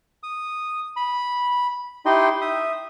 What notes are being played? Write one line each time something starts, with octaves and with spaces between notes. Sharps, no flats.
D#6
B5
D#4 E4 G4 D#5 G5 C6
E5 D#6